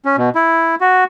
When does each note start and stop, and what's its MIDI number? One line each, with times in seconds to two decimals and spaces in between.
0.05 0.16 61
0.18 0.29 47
0.35 0.75 64
0.81 1.04 66